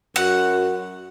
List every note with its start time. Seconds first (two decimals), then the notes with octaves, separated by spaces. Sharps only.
0.16 F#2 F#4 F#5